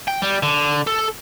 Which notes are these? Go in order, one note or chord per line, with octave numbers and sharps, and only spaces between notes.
G5
G3
D3
A4